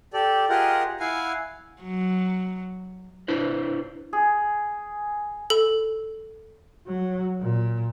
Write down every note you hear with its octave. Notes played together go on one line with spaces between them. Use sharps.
G4 A4 D5
F4 G4 G#4 A#4 D#5 F#5
E4 F5 F#5 G#5
F#3
D4 E4 B4 C5
G#4
A4
F#3
A#2